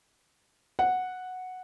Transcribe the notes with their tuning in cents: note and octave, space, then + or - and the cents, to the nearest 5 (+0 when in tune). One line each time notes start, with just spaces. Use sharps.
F#5 -5